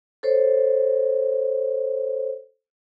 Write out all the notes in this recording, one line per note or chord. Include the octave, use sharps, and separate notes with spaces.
A4 C5 C#5